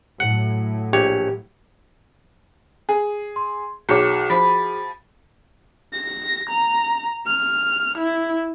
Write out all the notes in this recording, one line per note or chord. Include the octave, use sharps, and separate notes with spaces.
A2 F#3 F#5
A#1 G4 C#5
G#4
C6
B1 F#4 G#4 C#5 G5 C#6 D6
F3 B5
A#6
A#5
F6
E4